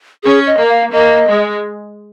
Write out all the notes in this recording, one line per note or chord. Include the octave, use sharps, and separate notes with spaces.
C#4 G#4
D#5
A#3
F5
A#3 D#5
G#3